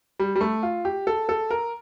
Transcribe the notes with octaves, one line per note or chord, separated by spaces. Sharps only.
G3
G3
A3
F4
G4
A4
A4
A#4